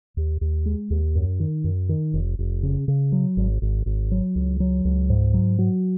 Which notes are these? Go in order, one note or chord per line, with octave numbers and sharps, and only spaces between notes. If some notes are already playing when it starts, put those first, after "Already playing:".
D#2
D#2
G#3
D#2
F#2
D#3
F#2
D#3
F1
F1
C#3
C#3
F#3
G#1
G#1
G#1
F#3
C#2
F#3
C#2
G#2
F#3
F#3